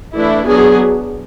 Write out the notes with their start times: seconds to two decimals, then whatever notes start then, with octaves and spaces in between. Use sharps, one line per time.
0.16 E3 A3 D4 E4
0.46 F#3 B3 D4 G#4